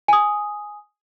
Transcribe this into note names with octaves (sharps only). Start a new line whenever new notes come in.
G#5 D#6